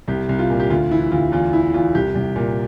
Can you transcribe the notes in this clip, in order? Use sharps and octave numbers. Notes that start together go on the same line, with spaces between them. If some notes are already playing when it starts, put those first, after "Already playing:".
C2 G4
C2
F4
A#2
G4
D2 F4
E3 E4
D2 F4
E2 F4
E3 E4
E2 F4
C2 G4
C2
A#2